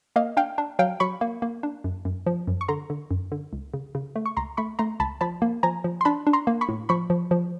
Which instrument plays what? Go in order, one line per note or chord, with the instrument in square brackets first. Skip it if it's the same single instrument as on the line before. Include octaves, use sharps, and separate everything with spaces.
[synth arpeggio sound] A#3 D#5 F5
D4 F5 G5
D4
F#3 F5 G5
F#3 B5 C#6
A#3
A#3
D4
F#2
F#2
F3
F#2
C#6
D3 A#5 C6
D3
F#2
D3
C#2
C#3
C#3
A3
C#6
C#2 A#5 C6
A3 B5 C#6
A3 A#5 C6
C#2 A5 B5
F3 A5 B5
A#3
F3 G#5 A#5
F3
C6
D4 A5 B5
D4
A#5 C6
A#3
B5 C#6
A2
F3 B5 C#6
F3
F3